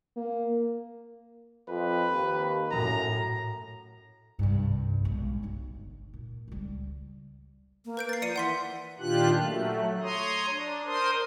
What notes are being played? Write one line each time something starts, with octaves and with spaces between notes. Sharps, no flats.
A#3
F2 B4
D#2
F#2 A2 A#5
C2 G2
B1 G#3
G1 D#4
A#2
C#2 G3
A#3
B4 G6 D7
A6 C7
F3 D5 C#7 D#7
E3 F#5 C6 B6
A#2 D#3 D4 F4 G4 F#6
F#3 A3
C#5 A#5 C6 D#6
D4
A#4 C5 C6 D#6